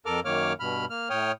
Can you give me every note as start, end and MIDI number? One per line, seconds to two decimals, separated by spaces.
0.06 0.20 41
0.06 0.20 69
0.06 0.20 70
0.06 0.20 86
0.06 0.20 89
0.25 0.53 42
0.25 0.53 51
0.25 0.53 58
0.25 0.53 73
0.25 0.53 86
0.25 0.53 89
0.60 0.85 43
0.60 0.85 47
0.60 0.85 83
0.60 0.85 89
0.90 1.09 58
0.90 1.09 89
1.10 1.32 45
1.10 1.32 73
1.10 1.32 79
1.10 1.32 87
1.10 1.32 89